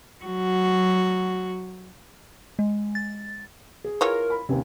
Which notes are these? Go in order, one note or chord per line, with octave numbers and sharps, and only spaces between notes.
F#3 F#4
G#3
A6
G#4
E3 F4 A#4 C#5
B5
D#2 C3 C#4